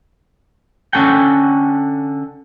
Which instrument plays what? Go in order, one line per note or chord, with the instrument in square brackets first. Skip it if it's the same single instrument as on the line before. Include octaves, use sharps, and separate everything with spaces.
[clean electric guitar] D3 C#4 A4 F#5 G5